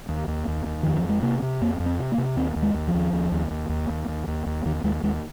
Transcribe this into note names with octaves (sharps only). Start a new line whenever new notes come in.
D#2
D#2
D#2
D#2
F2 D#3
F3
F2
G#3
C3 A#3
C3
F2 A#3
F2
C4
C3
A#3
C3
D#2 C4
D#2
G#3
D#2
F3
D#2
D#2
D#2
D#2
D#2
D#2
D#2
D#2
D#2
D#2 D#3
D#2 G#3
D#2 G#3